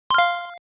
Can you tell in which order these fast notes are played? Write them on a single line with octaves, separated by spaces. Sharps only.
C6 F6 F5